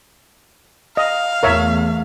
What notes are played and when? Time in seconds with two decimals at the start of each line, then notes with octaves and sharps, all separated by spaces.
0.97 D#5 F5
1.43 E2 A3 A#4 C#5 E5